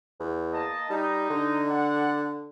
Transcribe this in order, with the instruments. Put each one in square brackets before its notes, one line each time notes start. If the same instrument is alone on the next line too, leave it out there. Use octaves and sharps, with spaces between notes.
[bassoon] E2
[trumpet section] A#3 D#5 A5
[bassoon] G3 [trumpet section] D#4
[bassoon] D3
[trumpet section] D5 F#5